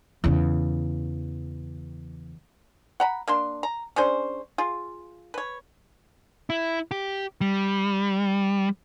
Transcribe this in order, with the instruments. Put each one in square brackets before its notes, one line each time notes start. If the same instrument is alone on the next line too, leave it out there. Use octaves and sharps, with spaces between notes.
[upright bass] E2 C#3
[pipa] F#5 A#5 B5
A#3 D4 C6
A#5
C#4 D4 G#4 C5
F4 G#4
B4 C#5
[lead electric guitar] E4
G4
G3